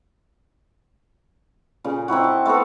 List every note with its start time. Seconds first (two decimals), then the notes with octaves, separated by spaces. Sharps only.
1.84 A#2 C#3
2.08 C4 D#4 E4 F#4
2.24 A5
2.46 A3 B3 F#4 A4